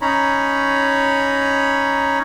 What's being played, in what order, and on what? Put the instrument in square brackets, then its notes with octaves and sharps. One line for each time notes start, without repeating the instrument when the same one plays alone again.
[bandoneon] C#4 D#4 C#5 A#5 B5